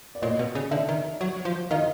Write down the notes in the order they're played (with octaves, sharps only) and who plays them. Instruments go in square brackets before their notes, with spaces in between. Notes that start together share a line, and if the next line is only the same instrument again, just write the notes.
[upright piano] D5
[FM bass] A#2 [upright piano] C#5 D#5
[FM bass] B2
C#3
[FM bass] D3 [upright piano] D5 E5
[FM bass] D#3
F#3
F3
[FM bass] D#3 [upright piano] D#5 F5